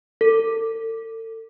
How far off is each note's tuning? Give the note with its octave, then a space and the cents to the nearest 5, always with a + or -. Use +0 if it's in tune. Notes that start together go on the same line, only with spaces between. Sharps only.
A4 +40